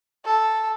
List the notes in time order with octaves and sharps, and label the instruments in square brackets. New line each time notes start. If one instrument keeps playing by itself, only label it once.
[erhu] A4